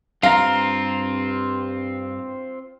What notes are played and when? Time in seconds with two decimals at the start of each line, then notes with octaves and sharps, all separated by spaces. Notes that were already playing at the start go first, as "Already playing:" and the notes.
0.23 G2 C4 F4 F5 A#5